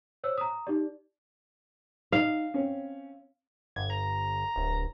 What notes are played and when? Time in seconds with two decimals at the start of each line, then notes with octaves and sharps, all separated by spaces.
0.24 C5 C#5 E6
0.38 A#5 D#6
0.67 D#4 G4 D5
2.12 D#4 F5
2.54 C4 C#4
3.76 G1 G#6
3.90 A#5
4.56 D1